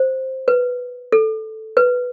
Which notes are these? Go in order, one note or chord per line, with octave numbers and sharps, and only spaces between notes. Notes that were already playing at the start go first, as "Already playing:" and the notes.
Already playing: C5
B4
A4
B4